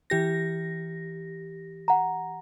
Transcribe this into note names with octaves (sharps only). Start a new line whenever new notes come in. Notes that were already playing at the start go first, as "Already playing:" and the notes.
E3 G4 A#6
F#5 A#5